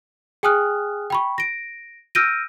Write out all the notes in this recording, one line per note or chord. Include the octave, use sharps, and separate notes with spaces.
G#4 G5 G#5 D#6 F6 F#6
G5 B5 C#6
A#6 D7
E6 F6 G6 A#6 D7 D#7